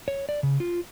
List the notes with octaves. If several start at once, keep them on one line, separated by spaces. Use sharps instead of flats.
C#5
D5
C#3
F4